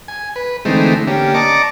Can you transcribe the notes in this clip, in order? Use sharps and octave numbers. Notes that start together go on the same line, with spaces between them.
G#5
B4
D3 E3 G#3 A3 C4 D#4
D3 A#3 C#4 G4
D5 D#5 A5 A#5 C#6 D6